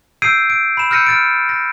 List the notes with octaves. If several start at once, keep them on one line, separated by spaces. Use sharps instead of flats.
E6 G6 G#6 C7 D7 D#7
D7
B5 E7
E6 F6 G6 A#6 C#7 D#7
F6 A6 D7
A#6